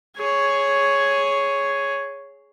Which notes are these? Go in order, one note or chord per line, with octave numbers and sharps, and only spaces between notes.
G#4 C#5